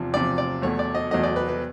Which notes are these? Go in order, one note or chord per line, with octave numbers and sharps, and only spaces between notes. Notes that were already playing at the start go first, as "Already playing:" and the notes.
Already playing: E2 C3 F3
E2 C3 F3 D5
D5
E2 B2 F#3 A3 C#5
D5
D#5
E2 B2 F#3 A3 D#5
D5
B4
B4